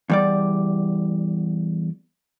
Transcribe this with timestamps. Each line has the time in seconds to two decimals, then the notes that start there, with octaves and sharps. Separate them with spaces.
0.10 E2 G3 D5